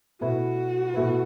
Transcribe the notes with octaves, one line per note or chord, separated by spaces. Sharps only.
B2 A3 E4 F#4 B4
B2 A3 E4 B4